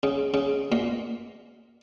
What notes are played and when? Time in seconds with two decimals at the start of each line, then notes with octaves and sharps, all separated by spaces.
0.03 C#3
0.34 C#3
0.72 A#2